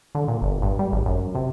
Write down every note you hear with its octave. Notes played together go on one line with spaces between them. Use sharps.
D3
A#2
G1
G2
G3
G#1
F#2
C3